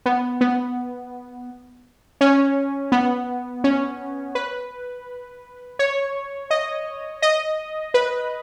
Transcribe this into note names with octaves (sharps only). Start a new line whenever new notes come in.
B3
B3
C#4
B3
C#4
B4
C#5
D#5
D#5
B4